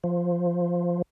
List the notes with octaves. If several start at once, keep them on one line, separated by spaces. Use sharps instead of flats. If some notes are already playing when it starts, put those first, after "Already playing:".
F3